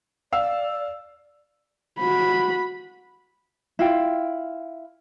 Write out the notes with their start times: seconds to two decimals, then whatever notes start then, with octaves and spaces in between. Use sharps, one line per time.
0.33 D5 F5 E6
2.00 F#4 B5
3.79 E4 F4 G5